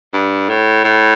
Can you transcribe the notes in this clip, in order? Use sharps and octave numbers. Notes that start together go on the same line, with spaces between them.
G2
A2
A2